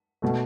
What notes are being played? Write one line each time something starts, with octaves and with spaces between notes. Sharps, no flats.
B2 A3